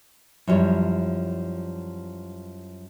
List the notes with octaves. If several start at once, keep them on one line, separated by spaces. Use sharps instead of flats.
F#2 F3 G3 E4 C#5